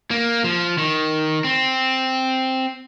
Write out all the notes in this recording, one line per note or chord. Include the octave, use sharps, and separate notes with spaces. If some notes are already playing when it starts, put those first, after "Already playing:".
A#3
F3
D#3
C4